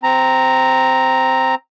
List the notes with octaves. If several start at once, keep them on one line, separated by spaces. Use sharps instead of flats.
C4 A#5